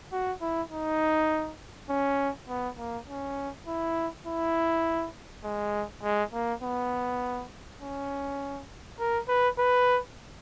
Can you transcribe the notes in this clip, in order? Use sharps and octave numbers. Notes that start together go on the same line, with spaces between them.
F#4
E4
D#4
C#4
B3
A#3
C#4
E4
E4
G#3
G#3
A#3
B3
C#4
A#4
B4
B4